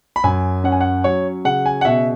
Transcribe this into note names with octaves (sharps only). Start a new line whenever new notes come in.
B5
F#2 G#5
C#4 F#5
G#5
F#5
F#3 C#5
C#3 F#5
G#5
F#5
B2 E5